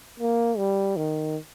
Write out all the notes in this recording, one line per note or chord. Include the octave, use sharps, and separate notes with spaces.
A#3
G3
D#3